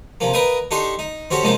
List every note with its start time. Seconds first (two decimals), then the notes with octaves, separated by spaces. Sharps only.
0.20 C3 F3 A#3
0.33 A#4 B4 D#5 F5 G5 G#5
0.71 D4 D#4 G4 A4 C6 C#6
0.99 D#4
1.31 C4 C#4 F#4 G4 A4
1.43 G#2 C3 F3 G#3 A#3 D#4